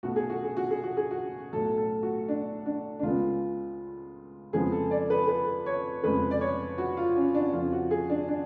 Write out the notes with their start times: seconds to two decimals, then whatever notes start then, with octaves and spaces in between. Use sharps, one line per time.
0.03 B1 B2 A3 F#4
0.16 G#4
0.30 F#4
0.43 G#4
0.57 F#4
0.71 G#4
0.84 F#4
0.97 G#4
1.11 F#4
1.53 B1 A2 F#3 A4
1.78 A4
2.03 F#4
2.28 D4
2.66 D4
2.99 D4
3.03 C#2 C#3 G#3 B3 F4
4.53 F2 C#3 F3 G#3 B3 G#4
4.72 A4
4.91 D5
5.10 B4
5.28 B4
5.66 C#5
6.03 F1 F2 C#3 G#3 B4
6.31 D5
6.41 C#5
6.78 F#4
6.97 F4
7.16 C#4
7.35 D4
7.53 F2 C#3 F3 F4
7.72 F#4
7.91 G#4
8.10 D4
8.28 D4